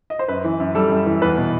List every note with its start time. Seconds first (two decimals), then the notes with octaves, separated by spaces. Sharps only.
0.10 D#5
0.19 C5
0.28 F#2 B4
0.44 E3
0.60 F#2
0.75 G3 A4
0.91 F#2
1.06 E3
1.22 E2 B4
1.37 B2